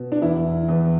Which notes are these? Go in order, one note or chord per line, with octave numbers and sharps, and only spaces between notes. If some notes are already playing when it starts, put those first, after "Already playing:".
Already playing: B2
D4
E2 E4
E2